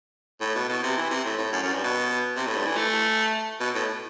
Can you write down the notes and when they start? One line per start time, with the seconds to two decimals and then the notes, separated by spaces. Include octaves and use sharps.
0.41 A2
0.55 B2
0.69 B2
0.83 C3
0.97 E3
1.11 C3
1.25 A2
1.38 A2
1.52 F#2
1.63 F#2
1.73 G2
1.84 B2
2.36 C3
2.47 A2
2.57 G2
2.67 E3
2.77 A3
3.60 B2
3.75 A2